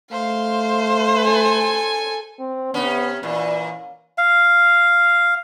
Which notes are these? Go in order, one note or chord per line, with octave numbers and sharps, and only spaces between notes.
A3 C5 F5
A4 G#5
C4
C3 B3 C#4
A#2 E3
F5